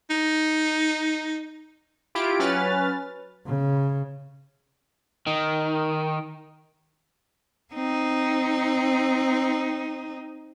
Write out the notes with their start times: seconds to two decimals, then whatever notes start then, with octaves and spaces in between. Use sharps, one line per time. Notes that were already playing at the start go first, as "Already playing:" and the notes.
0.10 D#4
2.15 E4 F4 G4 D7
2.39 F#3 C#4 B4 F6 A6
3.46 C#3
5.27 D#3
7.74 C4 D#4